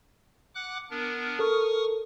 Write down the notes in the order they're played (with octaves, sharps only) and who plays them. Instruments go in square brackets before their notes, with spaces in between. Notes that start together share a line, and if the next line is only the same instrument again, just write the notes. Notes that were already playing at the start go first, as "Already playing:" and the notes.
[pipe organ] F#5 D6 F#6
B3 D4 A#4
[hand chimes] A4 A#4 [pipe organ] C#6 D#6 F6